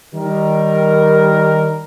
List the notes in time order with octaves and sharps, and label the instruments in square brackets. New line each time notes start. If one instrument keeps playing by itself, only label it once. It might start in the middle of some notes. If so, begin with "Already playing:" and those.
[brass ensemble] D#3 G3 A#4